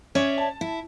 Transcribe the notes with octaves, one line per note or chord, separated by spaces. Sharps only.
C#4 C#5 D5 E5
A5
E4